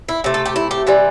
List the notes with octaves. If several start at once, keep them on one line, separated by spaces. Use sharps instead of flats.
E4
C3 A3
A4
G4
E4
G4
C3 E3 G3